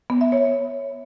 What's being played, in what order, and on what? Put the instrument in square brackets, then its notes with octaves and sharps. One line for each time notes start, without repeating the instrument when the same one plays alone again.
[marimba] B3
E5
C#5